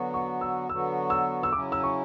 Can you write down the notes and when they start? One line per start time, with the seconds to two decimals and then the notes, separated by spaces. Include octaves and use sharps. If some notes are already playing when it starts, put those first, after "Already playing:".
Already playing: D3 F#3 B3 F#4
0.14 C#6
0.41 E6
0.69 D3 F#3 B3 F#4 E6
1.10 E6
1.43 E6
1.52 C#3 F#3 C#4 E4 D6
1.72 E6
1.83 C#6